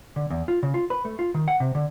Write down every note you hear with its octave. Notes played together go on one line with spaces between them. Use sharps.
D3
E2
F4
C#3
F4
B4
A3
F4
D#3
F#5
C3
D3